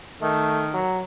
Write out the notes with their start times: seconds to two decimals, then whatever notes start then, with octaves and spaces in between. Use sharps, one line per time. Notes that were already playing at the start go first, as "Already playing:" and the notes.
0.22 D#3 A3
0.74 F#3